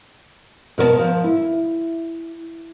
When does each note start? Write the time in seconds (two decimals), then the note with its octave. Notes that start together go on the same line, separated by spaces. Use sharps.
0.78 B2 A#4 C5 A5
0.99 F3
1.24 E4